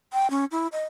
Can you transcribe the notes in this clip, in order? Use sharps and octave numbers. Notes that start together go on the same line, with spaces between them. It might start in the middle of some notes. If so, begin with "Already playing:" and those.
G5
C#4
E4
D#5